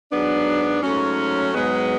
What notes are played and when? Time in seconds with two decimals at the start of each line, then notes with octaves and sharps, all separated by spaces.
0.10 G#2 F#3 B3 D4
0.82 G#2 F#3 A3 C#4
1.54 G#2 F#3 G#3 B3